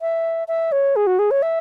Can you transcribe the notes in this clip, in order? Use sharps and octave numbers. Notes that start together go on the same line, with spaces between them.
E5
E5
C#5
G#4
F#4
G#4
C#5
E5